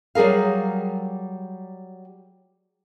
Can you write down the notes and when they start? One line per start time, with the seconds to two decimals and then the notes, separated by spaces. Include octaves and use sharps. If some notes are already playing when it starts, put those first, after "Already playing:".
0.15 F#3 G3 G#4 A#4 F5